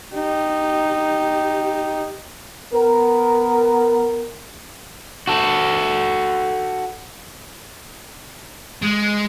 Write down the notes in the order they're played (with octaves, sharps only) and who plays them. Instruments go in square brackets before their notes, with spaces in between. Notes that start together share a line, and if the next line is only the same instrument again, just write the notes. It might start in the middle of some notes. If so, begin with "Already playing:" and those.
[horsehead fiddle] D#4 G4
[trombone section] B3 A#4
[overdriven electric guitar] F#4 A4
[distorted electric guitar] G#3